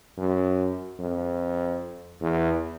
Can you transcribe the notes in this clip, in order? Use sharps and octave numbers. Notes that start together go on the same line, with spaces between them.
F#2
F2
E2